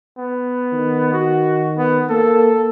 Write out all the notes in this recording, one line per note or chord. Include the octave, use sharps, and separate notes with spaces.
B3
D#3
F#4
B3
A#3 A4